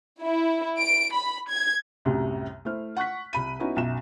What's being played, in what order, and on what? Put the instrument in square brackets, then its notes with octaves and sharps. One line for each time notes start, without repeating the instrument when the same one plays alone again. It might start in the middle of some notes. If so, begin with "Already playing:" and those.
[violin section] E4
D7
B5
G#6
[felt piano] C2 F#2 A2 C3 G3
A3 E4 C5 F6
F#5 C#6 F#6 B6
C2 B5 D#7
B3 C#4 D#4 E4 F#4
B1 F#2 E5 E7